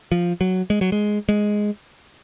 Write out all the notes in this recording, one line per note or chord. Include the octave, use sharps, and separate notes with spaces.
F3
F#3
G#3
F#3
G#3
G#3